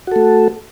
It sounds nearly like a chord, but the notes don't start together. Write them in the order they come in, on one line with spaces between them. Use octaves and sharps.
F#4 A4 A3